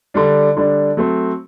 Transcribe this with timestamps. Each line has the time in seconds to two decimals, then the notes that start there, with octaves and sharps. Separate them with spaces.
0.14 D3 G3 D4
0.57 D3 G3 D4
0.97 F#3 A3 C4